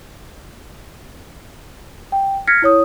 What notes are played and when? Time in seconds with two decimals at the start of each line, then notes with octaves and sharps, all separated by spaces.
2.12 G5
2.47 F6 G#6 A#6 B6 C#7
2.62 E4 C#5 D#6